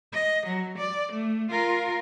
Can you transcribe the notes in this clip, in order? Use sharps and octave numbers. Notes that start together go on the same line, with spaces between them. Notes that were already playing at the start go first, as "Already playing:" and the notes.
D#5
F#3
D5
A3
F4 A#4